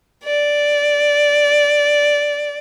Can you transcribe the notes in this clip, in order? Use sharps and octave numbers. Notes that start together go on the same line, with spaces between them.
D5